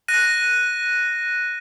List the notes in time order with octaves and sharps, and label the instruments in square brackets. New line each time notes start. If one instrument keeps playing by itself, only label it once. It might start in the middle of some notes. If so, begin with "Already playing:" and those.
[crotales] F#6 A#6 D#7